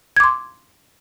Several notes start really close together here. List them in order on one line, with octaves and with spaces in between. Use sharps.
G#6 D6 C6